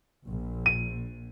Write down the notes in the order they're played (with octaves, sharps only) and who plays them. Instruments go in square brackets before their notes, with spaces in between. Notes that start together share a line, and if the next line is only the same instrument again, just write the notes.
[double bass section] A#1
[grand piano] D#7